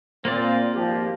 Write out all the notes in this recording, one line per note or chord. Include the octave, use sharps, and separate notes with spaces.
A#2 A#3 C4 F4 D5
G#1 F3 G4